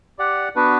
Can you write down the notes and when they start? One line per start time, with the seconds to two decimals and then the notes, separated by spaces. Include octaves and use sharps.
0.19 G4 D5 F#5
0.56 B3 D4 F#4 B4